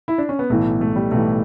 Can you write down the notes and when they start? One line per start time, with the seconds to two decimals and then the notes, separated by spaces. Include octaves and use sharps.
0.08 E4
0.18 D4
0.29 C#4
0.39 B3
0.50 B1 A2 E3 A3
0.81 A3
0.96 G3
1.11 B1 A2 E3 A3